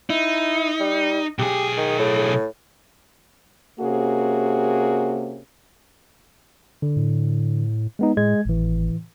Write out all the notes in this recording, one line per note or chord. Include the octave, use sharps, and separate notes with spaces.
D#4 E4
G3
B1 G4 G#4
D#3
A2
C3 A#3 C#4 F#4 G#4
D3
A2
G#3 B3 D#4
A2 G#3 G#6
G#1 A2 E3